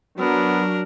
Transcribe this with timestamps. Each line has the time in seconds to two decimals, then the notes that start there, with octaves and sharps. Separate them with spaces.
0.19 F#3 B3 D4 A#4